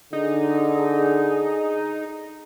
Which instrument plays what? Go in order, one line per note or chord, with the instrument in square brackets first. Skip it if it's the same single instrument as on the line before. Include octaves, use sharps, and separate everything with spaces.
[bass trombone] D3 [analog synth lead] D#4 [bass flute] G#4